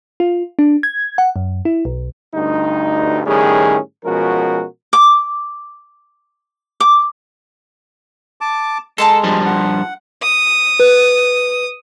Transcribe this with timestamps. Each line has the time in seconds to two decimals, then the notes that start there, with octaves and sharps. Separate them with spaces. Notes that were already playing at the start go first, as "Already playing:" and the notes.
0.20 F4
0.59 D4
0.83 G#6
1.18 F#5
1.36 F#2
1.65 E4
1.85 B1
2.34 D2 G2 D#4
3.26 A2 D#3 G3 C#4 G#4
4.05 B2 F3 G#3 C#4 F#4 A#4
4.93 D6
6.80 D6
8.41 A5 D6
8.98 G#3 A4 A5 A#5 C6
9.23 G2 F3 G3
9.46 F#5
10.23 D#6
10.80 B4